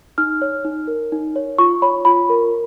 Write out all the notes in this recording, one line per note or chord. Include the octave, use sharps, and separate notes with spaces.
D#4 F6
C#5
D#4
A#4
D#4
C#5
F4 C#6
C#5 B5
F4 B5
A#4